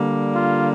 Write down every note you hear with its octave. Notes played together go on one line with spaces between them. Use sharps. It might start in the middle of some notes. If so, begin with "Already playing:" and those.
Already playing: D3 G3 A#3
F4